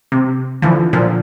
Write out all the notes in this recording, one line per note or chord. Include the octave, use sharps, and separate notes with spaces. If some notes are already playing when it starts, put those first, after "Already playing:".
C3
D3 E3 F3
A#2 D3 F3